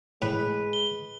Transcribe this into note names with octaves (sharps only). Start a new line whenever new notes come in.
A2 G#3 B4
G7